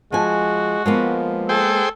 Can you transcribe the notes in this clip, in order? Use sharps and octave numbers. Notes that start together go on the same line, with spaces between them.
F3 G#3 F#4 G#5
F3 G#3 A#3 B3
G#4 A4 C5 G5